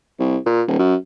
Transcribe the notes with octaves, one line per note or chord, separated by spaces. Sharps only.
C2
A#2
D#1
F#2